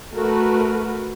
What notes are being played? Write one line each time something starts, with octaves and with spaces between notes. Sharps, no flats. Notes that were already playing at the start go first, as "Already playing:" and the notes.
A3 F#4 A#4 B4